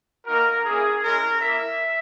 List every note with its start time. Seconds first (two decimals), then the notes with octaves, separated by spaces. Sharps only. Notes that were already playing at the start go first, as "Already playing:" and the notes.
0.26 A#3 D#4 F#4 A#4
0.64 A#3 C#4 E4 G#4
1.02 G#3 C#4 E4 A#4
1.41 A#3 E4 E5